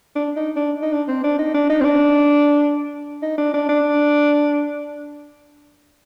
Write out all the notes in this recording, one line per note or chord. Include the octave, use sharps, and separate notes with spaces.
D4
D#4
D4
D#4
D4
C4
D4
D#4
D4
D#4
C4
D4
D#4
D4
D4
D4